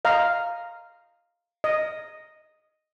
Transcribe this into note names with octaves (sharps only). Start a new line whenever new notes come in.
D#5 F5 A#5
D#5